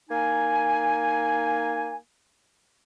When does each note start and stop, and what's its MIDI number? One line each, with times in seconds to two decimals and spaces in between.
0.10 1.95 58
0.10 1.95 63
0.10 1.95 80